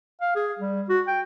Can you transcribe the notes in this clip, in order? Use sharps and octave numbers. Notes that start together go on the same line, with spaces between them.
F5
G#4
G3
F#4
G5